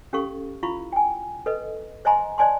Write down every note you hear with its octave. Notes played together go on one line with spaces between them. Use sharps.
C#4 G4 A4 F5 C#6
E4 F4 F5 B5 C#6
G5 G#5
A4 B4 D#5
C5 D#5 E5 G#5 A#5 C6
C5 D5 D#5 G#5 A5 C6